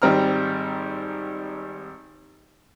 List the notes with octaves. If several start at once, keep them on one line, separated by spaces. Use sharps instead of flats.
G#1 G3 C4 A#5 F6